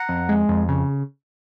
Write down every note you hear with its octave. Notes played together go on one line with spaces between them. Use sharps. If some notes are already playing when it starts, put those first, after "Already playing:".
Already playing: F#5 A#5
F2
G#3
F2
C#3